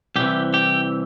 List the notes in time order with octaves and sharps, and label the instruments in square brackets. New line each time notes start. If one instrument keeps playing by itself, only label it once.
[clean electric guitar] C2 C3 E3 G4
G4